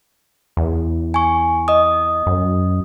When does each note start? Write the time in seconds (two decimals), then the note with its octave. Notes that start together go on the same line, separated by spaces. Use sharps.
0.57 E2
1.14 G#5 C#6
1.68 D#5 D#6
2.26 F#2